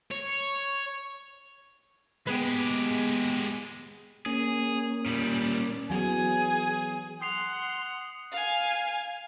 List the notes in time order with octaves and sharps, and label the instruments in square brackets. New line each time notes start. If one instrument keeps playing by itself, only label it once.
[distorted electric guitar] C#5
[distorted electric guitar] G#3 G4 [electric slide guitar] B3 G#4 B4
[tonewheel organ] A#3 C#4 [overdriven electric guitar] G#4
[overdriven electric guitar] A#2 G3
[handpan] E3 F#3 B3 [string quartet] G#4 [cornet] G#5
[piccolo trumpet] F#5 [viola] C6 [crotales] D#6 C7 F7
[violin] F5 G#5